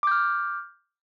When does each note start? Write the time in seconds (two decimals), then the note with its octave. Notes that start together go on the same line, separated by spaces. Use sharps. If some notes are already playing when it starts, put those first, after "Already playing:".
0.03 D6
0.07 G6
0.11 F6